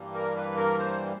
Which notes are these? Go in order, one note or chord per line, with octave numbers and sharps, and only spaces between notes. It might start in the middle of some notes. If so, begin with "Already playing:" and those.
Already playing: G2 E3 G3 A#3
A#4
B4
A#4
C5